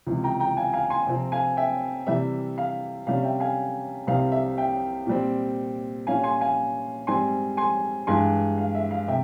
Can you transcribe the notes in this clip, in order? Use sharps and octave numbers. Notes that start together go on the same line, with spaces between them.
C#2 C3 E3
G5 A#5
G5 A#5
F5 G#5
F5 G#5
G#5 C6
C3 F3 C4
F5 G#5
E5 G5
C3 E3 G3 E5
F5
C3 G3 C#4 F5
E5 G5
F5 G#5
C2 C3 G3 C4 F5
E5
E5 G5
A#2 G3 C4
A#2 G3 C#4 F5 G#5
G#5 C6
F5 G#5
G#2 G3 C4 G#5 C6
G#5 C6
G2 E3 G#3 G#5 C6
F5
E5
F5
C3 E5 G5